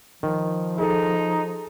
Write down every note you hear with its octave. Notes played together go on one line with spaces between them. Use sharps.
D#3 F3
D#4 G#4 A4